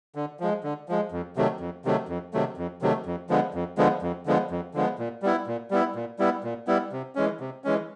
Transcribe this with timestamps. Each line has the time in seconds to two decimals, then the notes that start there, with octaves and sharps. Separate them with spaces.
0.15 D3
0.40 F3 G#3
0.64 D3
0.89 F3 G#3
1.12 F2
1.36 C3 D#3 F#3 A3
1.60 F2
1.85 C3 D#3 F#3 A3
2.09 F2
2.33 C3 D#3 F#3 A3
2.57 F2
2.82 C3 D#3 F#3 A3
3.06 F2
3.29 D3 F3 G#3 B3
3.54 F2
3.78 D3 F3 G#3 B3
4.02 F2
4.26 D3 F3 G#3 B3
4.51 F2
4.74 D3 F3 G#3 B3
4.99 A#2
5.22 G3 B3 E4
5.47 A#2
5.71 G3 B3 E4
5.95 A#2
6.19 G3 B3 E4
6.44 A#2
6.67 G3 B3 E4
6.92 C3
7.15 E3 G#3 C#4
7.40 C3
7.64 E3 G#3 C#4